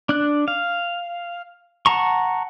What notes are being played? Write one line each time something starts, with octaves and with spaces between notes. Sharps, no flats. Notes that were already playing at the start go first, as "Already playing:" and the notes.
D4 F#6
F5
F#5 A5 A#5 C#6